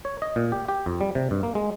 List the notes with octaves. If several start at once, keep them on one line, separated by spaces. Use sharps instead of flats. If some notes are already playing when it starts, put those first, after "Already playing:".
C#5
D#5
A#2
G4
G4
F2
G3
C3
G2
A#3
G#3